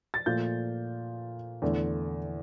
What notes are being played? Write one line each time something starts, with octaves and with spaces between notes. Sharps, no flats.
A6
A#2 F3 A3 G6
E2 D3 A3